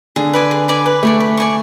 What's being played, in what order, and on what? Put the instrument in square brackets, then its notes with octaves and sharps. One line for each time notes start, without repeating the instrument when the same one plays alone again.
[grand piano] D3 [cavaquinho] G#4
[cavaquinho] B4 D5 G#5
G#4
B4 D5 G#5
B4
[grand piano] A3 [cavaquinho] D5 G#5 C#6
[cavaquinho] B4
D5 G#5 C#6